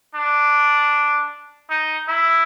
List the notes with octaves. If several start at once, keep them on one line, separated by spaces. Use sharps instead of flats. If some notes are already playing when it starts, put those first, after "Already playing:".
D4
D#4
E4